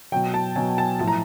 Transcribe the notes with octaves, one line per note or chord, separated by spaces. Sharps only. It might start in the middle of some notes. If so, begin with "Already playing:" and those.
B2 F#3 G5
A5
B2 F#3 G#5
A5
A2 F3 A5
A#5